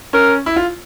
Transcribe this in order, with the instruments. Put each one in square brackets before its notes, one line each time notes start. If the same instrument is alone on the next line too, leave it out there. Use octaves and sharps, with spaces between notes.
[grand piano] C#4 [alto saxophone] A#4
[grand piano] E4
F4